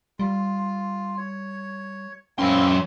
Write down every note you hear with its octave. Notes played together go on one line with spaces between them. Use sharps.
G3 F4
C#5
F#2 A#3 C4 C#4 E4 C6